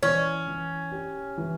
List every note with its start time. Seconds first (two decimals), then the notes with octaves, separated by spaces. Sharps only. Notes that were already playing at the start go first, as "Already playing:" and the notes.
0.03 E3 C#4
0.48 E3
0.92 G4
1.38 E3